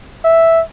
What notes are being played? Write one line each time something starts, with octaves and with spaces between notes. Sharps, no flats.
E5